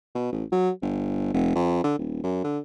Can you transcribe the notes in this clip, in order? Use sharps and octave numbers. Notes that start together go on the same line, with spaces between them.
B2
A1
F#3
G1
F1
F2
D3
D#1
F#2
D3